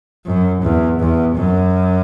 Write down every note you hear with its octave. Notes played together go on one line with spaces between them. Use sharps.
F#2
E2
E2
F#2